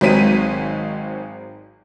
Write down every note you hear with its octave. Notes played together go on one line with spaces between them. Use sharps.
G#1 F#3 G#3 C4 B6 D#7